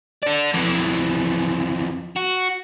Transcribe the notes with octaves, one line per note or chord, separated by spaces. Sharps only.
A4 D5
F2 E3
F#4